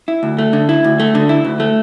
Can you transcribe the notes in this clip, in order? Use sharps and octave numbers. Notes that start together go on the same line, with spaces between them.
E4
D2
A3
D3
E4
D2
A3
D3
E4
D2
A3